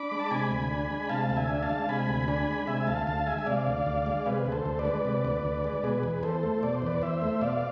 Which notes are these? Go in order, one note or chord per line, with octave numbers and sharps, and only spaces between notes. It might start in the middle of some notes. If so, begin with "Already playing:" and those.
Already playing: D4 B5 D6
G#3
A5
C3 G#5 B5
D2
D4
G#3
C3 F5 A5
D2 F5
E5 G#5
D4
F5 A5
G#3
C3 G#5 B5
D2
D4 G#5 B5
G#3
C3 E5 G#5
D2 F5 A5
D2 F5 A5
G#3 E5 G#5
G#5
C3 D5 F5
D2
D2
G#3
C3 G#4 B4
D2
A4 C5
D2
B4 D5
G#3
C3
D2
D2
G#3
B2 G#4 B4
E2
E2 A4 C5
A3
B2 D5
C5
E2 B4 D5
E2 C5 E5
A3
B2 D5 F5